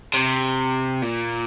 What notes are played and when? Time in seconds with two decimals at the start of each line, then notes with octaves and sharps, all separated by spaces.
0.14 C3
1.02 A#2